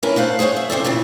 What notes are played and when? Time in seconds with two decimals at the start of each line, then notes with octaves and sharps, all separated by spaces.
0.03 C#4 D4 E4 A#4 B4
0.16 A3 C5 F5 F#5
0.39 G#4 C5 C#5 E5 F#5
0.57 E5
0.70 C#3 C4 D4 A4
0.85 F2 A#2 C#3 E3